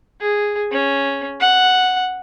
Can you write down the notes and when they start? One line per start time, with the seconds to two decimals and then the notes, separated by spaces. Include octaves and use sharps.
0.20 G#4
0.72 C#4
1.40 F#5